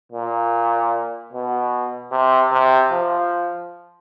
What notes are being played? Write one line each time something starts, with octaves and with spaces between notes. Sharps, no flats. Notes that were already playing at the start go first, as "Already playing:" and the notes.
A#2
B2
C3
C3
F3